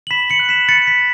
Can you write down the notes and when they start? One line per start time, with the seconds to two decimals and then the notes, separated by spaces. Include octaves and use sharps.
0.07 F#7
0.11 B5 B6 E7
0.30 C#7 F#7
0.39 F#6
0.49 B6 E7
0.68 B5 A6 C#7
0.87 B6
0.98 F#6